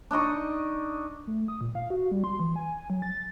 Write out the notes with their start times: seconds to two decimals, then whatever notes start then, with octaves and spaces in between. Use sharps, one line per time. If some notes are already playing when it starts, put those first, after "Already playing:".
0.11 D4 D#4 D#5 C#6
1.27 A3
1.48 D#6
1.61 A#2
1.75 F5
1.90 F#4
2.11 G3
2.24 C6
2.40 E3
2.56 G#5
2.90 F#3
3.02 A6